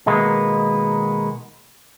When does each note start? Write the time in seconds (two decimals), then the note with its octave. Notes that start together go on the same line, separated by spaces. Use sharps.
0.06 B2 D#3 G#3 A#3 B3